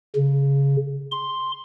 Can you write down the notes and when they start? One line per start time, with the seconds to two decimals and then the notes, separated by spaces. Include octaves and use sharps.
0.16 C#3
1.12 C6